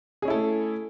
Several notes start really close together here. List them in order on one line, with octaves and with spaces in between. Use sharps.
G#4 C#4 E4 A4 A3